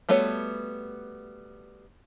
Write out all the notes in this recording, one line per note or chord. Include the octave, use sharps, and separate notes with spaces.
G3 A3 B3 F#4 C#5